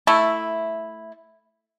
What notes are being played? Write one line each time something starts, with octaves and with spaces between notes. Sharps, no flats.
A3 E4